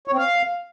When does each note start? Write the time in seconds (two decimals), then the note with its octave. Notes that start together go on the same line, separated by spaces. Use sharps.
0.08 C#5
0.13 C4
0.18 F5